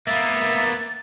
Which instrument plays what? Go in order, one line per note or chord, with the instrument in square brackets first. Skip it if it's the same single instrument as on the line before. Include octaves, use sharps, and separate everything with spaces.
[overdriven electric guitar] A#3 B3 [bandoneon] E5 [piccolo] A6